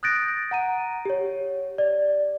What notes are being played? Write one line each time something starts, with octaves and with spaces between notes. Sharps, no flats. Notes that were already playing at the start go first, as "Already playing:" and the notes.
D#6 F#6 G6 A6 A#6 D7
F#5 A#5 D#7
G4 C#5
D5